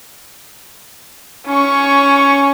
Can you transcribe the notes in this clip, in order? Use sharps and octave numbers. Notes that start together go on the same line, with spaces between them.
C#4 C#6